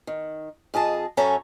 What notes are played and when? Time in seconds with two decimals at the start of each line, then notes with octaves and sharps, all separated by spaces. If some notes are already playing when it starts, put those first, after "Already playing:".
0.07 D#3
0.74 F2 G#4 D#5 A5
1.17 F#2 C#4 A4 C#5 E5 A#5